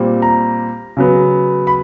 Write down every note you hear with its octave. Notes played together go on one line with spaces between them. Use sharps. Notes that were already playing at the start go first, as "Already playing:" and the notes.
Already playing: A#2 G3 C4
A#5
C#3 F#3 B3
B5